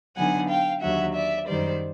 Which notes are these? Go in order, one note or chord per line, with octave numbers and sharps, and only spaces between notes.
D3 F#3 B3 D#4 F#5 G#5
F5 G5
D#2 D3 F#3 E5 F#5
D5 E5
F#2 D#3 G3 C5 D5